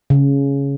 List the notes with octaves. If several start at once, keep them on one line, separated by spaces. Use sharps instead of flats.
C#3